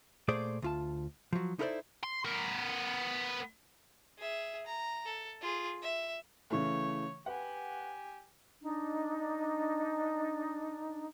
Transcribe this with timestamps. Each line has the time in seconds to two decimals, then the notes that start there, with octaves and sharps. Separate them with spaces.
0.28 A#2 A3 G#4 C5 D5
0.62 D2 F4 A5
1.33 F3 F#3
1.59 D#4 E4 A4 A#4 C5 D5
2.03 C6
2.25 B3 A#4
4.18 G#4 E5
4.66 A#5
5.05 A4
5.41 F4 G#4
5.82 E5
6.51 C#3 E3 A3 C#5
7.26 G4 B4 F#5 G#5
8.62 D4 D#4